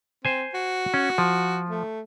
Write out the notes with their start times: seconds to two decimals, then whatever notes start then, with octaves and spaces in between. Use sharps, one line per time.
0.25 C4 C5 G#5
0.54 F#4
0.94 C#4
1.18 F3
1.70 A3